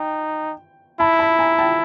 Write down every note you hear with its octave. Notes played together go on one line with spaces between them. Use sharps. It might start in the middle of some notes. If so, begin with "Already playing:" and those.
Already playing: D#4 G5
E4 A5 B5
A5 B5
G#5 A#5
G5 A5